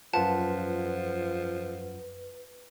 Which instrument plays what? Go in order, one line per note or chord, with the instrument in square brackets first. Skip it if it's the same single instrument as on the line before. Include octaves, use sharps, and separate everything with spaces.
[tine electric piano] F#2 F4 F#5 [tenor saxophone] F3 [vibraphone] B4 [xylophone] A5